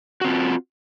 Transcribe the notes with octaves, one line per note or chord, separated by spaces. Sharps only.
C4 F4 F#4